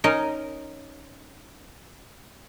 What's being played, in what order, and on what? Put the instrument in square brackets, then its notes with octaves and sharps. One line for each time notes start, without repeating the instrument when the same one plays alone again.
[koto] C#4 D#4 A#4 D#5